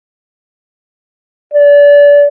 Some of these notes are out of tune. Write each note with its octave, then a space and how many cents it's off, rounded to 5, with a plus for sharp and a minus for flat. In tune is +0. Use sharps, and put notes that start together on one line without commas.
D5 -30